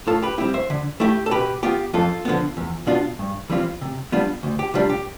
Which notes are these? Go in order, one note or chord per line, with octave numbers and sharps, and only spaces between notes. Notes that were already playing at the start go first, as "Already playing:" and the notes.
A2 F4 A4
G4 B4
G3 C4 E4 G4
C5 E5
D3
A3 E4 G4
A4
B2 G4 B4
B3 F4 G4
F2 F4 A4
D3 F3 B3
E2
B2 B3 D4 F4
G2
E3 G3 C4 F4
C3
G3 B3 D4 F4
D2
G4
C3 G3 D4 F4
G4